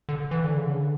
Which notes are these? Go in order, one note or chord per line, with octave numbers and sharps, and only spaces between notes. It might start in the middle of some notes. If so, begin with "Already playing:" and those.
D3
E3
D3
C#3
D3